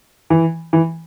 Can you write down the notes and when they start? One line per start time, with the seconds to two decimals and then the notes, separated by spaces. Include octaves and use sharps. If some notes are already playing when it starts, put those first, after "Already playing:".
0.30 E3
0.73 E3